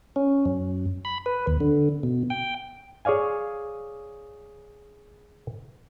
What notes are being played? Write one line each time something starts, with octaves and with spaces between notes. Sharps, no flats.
C#4
F#2
B5
B4
D#2
D3
B2
G5
G#4 C#5 D5 F5 G#5